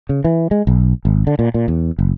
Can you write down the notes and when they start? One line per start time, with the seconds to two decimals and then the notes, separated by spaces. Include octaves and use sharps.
0.09 C#3
0.24 E3
0.51 G#3
0.67 B1
1.05 G#1
1.27 D3
1.39 A#2
1.54 A#2
1.68 E2
1.99 F#1